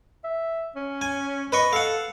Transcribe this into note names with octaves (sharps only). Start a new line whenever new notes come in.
E5
C#4
G#5
B4 D#5 C#6
A4 F5 F#5